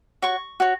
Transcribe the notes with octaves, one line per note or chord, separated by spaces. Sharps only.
F#4 C#5 C#6
F#4 C#5